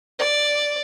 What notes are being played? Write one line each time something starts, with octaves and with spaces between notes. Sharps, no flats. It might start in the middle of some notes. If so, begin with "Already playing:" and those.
D5